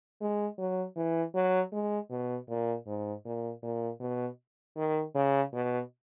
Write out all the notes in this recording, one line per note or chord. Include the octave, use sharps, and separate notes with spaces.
G#3
F#3
E3
F#3
G#3
B2
A#2
G#2
A#2
A#2
B2
D#3
C#3
B2